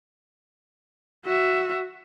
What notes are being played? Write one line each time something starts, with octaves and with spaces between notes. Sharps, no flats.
F#4 E5